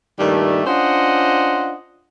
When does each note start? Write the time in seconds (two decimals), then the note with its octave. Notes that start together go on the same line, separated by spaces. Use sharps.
0.20 G2 A#2 D#3 G3 A3
0.66 C#4 D4 F4 C5 D#5 F#5